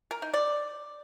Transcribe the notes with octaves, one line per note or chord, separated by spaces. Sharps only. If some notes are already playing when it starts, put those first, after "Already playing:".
A#4
D#4
D5